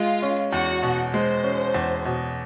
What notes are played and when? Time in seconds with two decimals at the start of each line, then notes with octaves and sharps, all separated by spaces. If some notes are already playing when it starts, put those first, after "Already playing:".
Already playing: G#3 F4
0.22 C#4
0.52 E2 F#4
0.83 B2
1.13 G#3 C5
1.44 C#4
1.74 E2
2.05 B2